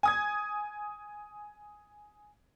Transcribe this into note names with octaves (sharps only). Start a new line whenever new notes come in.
G#5 D#6 G#6